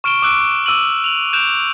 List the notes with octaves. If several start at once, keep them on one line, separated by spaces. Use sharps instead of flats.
C#6 F6 D7 E7 G7
D6 E6 F#6 D7
D6 E6 D#7 F#7
F7 F#7
F#6 G6 D7 E7 F7